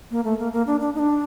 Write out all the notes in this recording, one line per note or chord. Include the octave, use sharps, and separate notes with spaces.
A#3
A3
A#3
A#3
D4
D4
D#4
D4